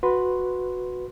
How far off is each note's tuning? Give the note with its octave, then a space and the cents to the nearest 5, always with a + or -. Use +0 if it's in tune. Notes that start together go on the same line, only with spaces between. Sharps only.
F#4 -10 B4 +0 C6 -5